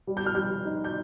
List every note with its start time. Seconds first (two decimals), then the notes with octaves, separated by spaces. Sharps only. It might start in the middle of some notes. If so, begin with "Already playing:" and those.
0.07 G3
0.17 G6
0.26 F6
0.35 G3 G6
0.65 D#4
0.84 G6